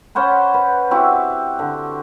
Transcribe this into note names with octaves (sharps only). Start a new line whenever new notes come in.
C#4 C5 F#5 B5
B4
C4 E4 F#4 G4
D3